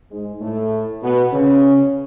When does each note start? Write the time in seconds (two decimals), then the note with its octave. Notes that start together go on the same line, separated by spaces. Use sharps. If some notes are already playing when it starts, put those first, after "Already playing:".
0.11 G#2 G#3
0.41 A2 A3
1.02 B2 B3
1.32 C#3 C#4